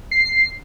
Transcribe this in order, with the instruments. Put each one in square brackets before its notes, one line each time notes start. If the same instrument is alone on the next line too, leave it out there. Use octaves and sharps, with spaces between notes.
[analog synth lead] C7